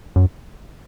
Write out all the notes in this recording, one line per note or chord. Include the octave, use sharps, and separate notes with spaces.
F#2